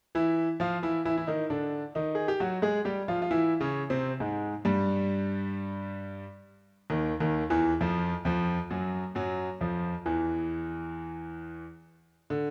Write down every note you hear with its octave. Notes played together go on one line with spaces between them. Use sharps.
E3 E4
F3 F4
E3 E4
E3 E4
E4
D#3 D#4
D3 D4
D#3 D#4
G#4
G4
F#3 F#4
G#3 G#4
G3 G4
F3 F4
F4
E3 E4
C#3 C#4
C3 C4
G#2 G#3
G2 G3
D#2 D#3
D#2 D#3
E2 E3
F2 F3
F2 F3
F#2 F#3
F#2 F#3
F2 F3
E2 E3
D3